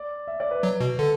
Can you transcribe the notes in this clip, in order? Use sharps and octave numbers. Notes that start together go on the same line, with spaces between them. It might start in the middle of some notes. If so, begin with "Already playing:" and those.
Already playing: D5
E5
D5
B4
F#3
B2
D3 A4